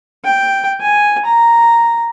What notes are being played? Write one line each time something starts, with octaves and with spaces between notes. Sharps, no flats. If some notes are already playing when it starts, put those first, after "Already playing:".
G5
G#5
A#5